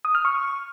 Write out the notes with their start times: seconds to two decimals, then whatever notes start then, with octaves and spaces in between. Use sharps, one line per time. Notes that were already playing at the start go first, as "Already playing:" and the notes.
0.05 D#6
0.15 F6
0.25 C#6